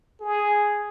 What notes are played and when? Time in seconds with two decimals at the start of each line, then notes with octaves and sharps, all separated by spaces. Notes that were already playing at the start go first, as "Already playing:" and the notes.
0.21 G#4